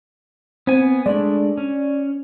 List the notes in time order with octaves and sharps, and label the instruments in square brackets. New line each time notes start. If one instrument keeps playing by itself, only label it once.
[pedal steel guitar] B3 G#5 [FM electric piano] C4
[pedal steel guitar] G#3 A3 D4 [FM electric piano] D5
[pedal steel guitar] C#4